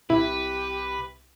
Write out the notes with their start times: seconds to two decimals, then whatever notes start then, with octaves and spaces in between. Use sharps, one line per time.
0.10 C2 E4 G4 B4